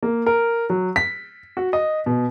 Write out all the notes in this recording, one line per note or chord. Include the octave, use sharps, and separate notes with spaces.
A#3
A#4
F#3
B6
F#4
D#5
B2